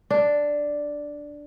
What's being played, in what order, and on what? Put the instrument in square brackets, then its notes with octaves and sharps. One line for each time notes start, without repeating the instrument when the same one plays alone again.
[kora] D4